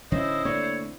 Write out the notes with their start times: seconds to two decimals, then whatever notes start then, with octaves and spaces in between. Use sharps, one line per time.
0.12 D1 D3 C#4 E4 C5 D#5
0.45 D3 A3 A#3 C4 C#5 D5